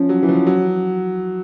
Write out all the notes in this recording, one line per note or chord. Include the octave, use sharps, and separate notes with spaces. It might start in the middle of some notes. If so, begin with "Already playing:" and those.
Already playing: F3 C#4
F#3
E3
F3
F#3